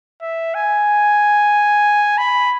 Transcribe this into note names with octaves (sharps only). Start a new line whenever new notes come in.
E5
G#5
B5